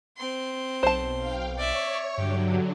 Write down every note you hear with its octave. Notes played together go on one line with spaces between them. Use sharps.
C4 C6
B1 C5 A5
F5 G5
C#5 D5 E5 C#6
G2 D3 F#3 G4